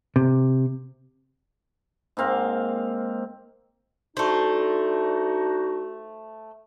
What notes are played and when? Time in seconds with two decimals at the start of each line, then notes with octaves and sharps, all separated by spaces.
0.16 C3
2.17 G#2 A#3 C4 F5
4.17 A3 D4 D#4 F#4 C5